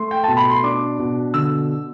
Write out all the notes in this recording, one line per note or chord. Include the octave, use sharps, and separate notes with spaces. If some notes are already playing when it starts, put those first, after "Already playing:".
Already playing: A3 C6
G5
B2 A5
B5
C6
D4 D6
B2
D3 E6